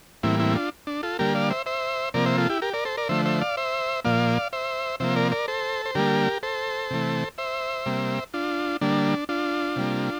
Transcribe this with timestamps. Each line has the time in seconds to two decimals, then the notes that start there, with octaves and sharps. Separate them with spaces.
0.23 A2 E3 G3 A#3 C4 E4
0.39 C4 E4
0.55 D4 F4
0.87 D4
1.03 F4 A4
1.19 D3 G3 A#3 G4 A#4
1.35 D5 F5
1.50 C5 E5
1.66 C5 E5
2.14 C3 F3 A#3 A#4 D5
2.26 C5 E5
2.37 F4 A4
2.49 E4 G4
2.62 G4 A#4
2.73 A#4 D5
2.85 A4 C5
2.97 A#4 D5
3.09 D3 F3 A3 C5 E5
3.25 C5 E5
3.41 D5 F5
3.57 C5 E5
4.04 A#2 F3 A#3 D5 F5
4.53 C5 E5
5.00 C3 F3 A#3 C5 E5
5.16 A#4 D5
5.32 A#4 D5
5.48 A4 C5
5.86 C5
5.95 D3 G3 A#3 G4 A#4
6.43 A4 C5
6.91 C3 E3 A3
7.38 C5 E5
7.86 C3 G3 A#3
8.34 D4 F4
8.81 D3 G3 A#3 D4
9.29 D4 F4
9.76 C3 G3 A#3